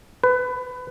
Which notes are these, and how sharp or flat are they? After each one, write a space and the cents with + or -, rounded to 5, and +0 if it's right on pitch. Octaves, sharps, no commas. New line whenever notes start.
B4 +25